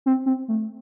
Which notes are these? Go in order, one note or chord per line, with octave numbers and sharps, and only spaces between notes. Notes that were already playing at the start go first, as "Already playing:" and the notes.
C4
C4
A3